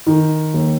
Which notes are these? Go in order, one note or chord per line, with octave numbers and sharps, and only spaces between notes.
D#3
D#2